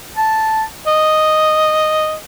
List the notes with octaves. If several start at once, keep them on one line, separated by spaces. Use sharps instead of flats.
A5
D#5